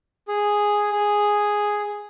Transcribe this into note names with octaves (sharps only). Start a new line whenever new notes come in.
G#4
G#4